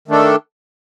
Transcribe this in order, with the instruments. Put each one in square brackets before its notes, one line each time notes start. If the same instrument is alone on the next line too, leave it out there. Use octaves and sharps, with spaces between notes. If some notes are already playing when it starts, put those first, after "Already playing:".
[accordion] D#3 A3 D4 A4